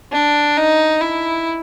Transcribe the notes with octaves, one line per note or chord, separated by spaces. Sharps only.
D4
D#4
E4